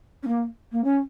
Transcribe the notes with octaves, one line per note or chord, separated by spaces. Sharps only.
C#4
A#3
A#3
C#4